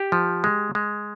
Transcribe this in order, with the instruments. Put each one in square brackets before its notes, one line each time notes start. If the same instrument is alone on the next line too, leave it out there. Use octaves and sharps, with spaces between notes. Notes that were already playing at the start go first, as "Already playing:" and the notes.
Already playing: [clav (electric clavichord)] G4
F3
G#3
G#3